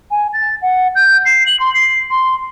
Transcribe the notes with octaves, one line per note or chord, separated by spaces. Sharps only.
G#5
A6
F#5
G6
C7
F#7
C6
C7
C6